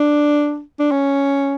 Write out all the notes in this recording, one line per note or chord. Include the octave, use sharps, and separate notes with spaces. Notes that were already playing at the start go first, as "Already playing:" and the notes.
Already playing: D4
D4
C#4